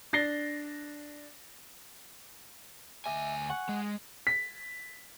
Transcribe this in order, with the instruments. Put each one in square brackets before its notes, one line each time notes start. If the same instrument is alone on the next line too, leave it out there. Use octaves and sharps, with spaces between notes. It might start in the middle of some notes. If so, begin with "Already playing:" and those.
[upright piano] D4 A6 A#6 C7 G7
[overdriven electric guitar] D2 G#5 [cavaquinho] D#5 E5 D6
[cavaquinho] F#5 G#5 C#6
[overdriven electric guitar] G#3
[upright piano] B6